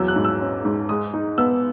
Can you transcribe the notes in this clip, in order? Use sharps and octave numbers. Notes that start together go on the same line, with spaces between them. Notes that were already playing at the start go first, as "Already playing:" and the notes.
Already playing: E2 F#3 E6
F#6
G#2
E6
C#4
G#2
G#3 D#6
D#4
B3 E6